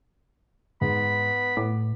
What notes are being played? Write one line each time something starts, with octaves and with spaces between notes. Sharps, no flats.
G#2 B3 B5
A2 D6